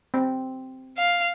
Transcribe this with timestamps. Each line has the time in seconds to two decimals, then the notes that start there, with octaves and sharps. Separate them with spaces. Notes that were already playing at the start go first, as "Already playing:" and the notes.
0.14 C4
0.98 F5